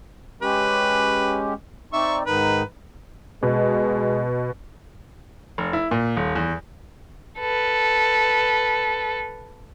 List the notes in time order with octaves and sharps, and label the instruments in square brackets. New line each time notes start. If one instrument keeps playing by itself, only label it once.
[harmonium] G#3 C#4 G4 [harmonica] B4
[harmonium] C4 D#4 D5 [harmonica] E5 C#6
[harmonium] G#2 D#3 D#4 [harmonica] B4
[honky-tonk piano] B2 [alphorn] G#3
[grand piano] F1
E4
A#2
D#1
E2
[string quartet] A4 B4